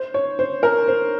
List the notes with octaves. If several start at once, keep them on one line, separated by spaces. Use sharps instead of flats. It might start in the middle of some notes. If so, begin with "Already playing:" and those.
Already playing: C5
C#5
C5
A#4
C5